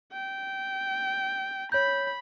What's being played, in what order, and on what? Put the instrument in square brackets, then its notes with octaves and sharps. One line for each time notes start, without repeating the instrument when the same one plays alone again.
[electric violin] G5
[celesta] C#5 G6 [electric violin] B5